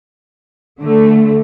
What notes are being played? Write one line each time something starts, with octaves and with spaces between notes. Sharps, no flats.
D3 A3